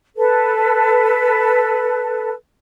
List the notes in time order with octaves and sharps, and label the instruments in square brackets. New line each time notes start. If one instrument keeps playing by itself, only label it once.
[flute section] A4 B4